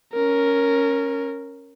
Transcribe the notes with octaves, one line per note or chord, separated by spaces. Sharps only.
C#4 A#4